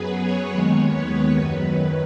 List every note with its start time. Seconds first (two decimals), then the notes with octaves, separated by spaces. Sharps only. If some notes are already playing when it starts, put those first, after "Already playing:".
Already playing: F#2 F#3 B3 G#4 B4
0.22 C#5
0.51 D#2 D#3 G#3 B3 C#5
0.94 B4
1.38 F#2 D#3 F#3 B4
1.67 B4